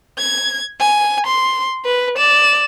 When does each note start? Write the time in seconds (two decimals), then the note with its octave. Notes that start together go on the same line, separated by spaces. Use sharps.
0.18 G#6
0.80 G#5
1.26 C6
1.85 B4
2.17 D5 E7